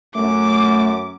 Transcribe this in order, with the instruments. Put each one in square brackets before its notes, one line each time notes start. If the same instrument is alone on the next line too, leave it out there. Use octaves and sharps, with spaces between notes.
[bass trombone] F#2 [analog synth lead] A3 [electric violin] D6